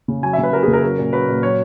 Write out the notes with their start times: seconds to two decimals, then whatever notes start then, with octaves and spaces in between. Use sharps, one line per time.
0.08 C#3
0.23 F#3 G#5
0.33 E5
0.38 C#3
0.43 B4
0.53 F#3 A#4
0.63 G#4
0.68 C#3
0.73 A#4
0.82 F#3
0.98 A#2
1.13 F#3 B4
1.28 A#2
1.43 F#3 C#5